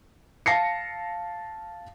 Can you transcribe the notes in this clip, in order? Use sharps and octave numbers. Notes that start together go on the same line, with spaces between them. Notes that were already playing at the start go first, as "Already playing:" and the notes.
F5 A5 A#6 C7 C#7